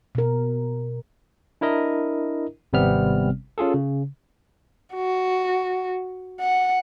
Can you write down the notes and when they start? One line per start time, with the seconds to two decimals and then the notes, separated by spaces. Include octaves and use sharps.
0.15 B2 A#4
1.61 D4 E4 A#4 D#5
2.73 G#1 C3 G3 B3 C4 F6
3.58 C#4 F4 G#4 A4
3.74 C#3
4.94 F#4
6.40 F#5